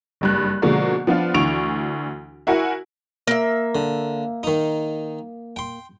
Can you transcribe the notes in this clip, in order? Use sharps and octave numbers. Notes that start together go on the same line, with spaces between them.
F#1 G2 F#6
B2 D3 F3 G#3 A#3
F3 B3 D4 F4
D2 E3 D4 C#6 D7 F7
E4 F#4 A#4 F#5 G#5
A#3 E5
D3
D#3 D#4
G5 C6